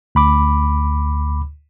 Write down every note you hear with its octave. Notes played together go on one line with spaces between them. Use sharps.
D2 B5 D6